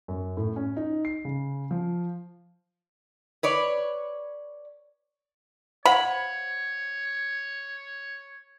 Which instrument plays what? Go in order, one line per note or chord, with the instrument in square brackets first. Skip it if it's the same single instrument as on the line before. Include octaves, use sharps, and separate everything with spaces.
[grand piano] F#2
A2
C#4
D#4
C7
C#3
F3
[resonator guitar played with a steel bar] B4 C#5 D5
[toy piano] C5 F5 F#5 [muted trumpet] C#5 [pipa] B5